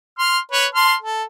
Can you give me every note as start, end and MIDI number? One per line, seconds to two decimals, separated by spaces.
0.19 0.39 84
0.19 0.39 89
0.52 0.66 71
0.52 0.66 73
0.75 0.94 81
0.75 0.94 84
0.75 0.94 89
1.02 1.23 69